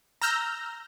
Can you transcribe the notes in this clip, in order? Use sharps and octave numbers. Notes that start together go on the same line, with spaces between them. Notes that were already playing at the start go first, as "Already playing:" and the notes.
A#5 E6 F6 G6 A#6